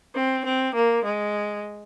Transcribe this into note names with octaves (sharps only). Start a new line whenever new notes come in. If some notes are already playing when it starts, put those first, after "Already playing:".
C4
C4
A#3
G#3